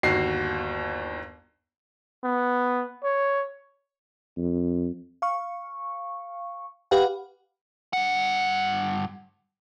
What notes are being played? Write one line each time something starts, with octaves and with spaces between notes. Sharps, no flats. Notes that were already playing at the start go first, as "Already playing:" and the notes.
G1 D#2 F#4 C7
B3
C#5
F2
F5 C#6
G4 B4 F5 F#5
G2 F#5